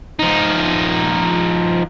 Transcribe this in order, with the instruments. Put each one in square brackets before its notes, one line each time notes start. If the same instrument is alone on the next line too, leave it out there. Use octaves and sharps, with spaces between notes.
[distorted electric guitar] F3 D#4